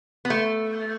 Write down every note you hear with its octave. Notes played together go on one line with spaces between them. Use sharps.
B3
A3